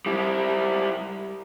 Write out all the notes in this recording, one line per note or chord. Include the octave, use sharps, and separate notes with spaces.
G3 E4